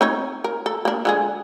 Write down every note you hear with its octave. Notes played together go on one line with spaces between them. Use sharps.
C4 D#4 C#5
A#4
A4
A#3 D4
D3 G#3 G#4